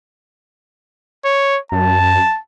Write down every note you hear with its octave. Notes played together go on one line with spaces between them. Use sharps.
C#5
F#2 A5